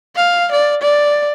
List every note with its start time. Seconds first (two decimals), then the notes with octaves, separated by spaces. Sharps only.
0.16 F5
0.52 D5
0.82 D5